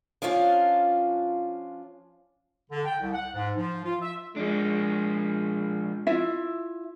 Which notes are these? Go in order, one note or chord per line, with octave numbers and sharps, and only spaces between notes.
F3 C#4 D4 F4 F5
D3
G5
C2
F#5
G#2
F3
F4
E5
F3 G#3 D4
E4 F4 E5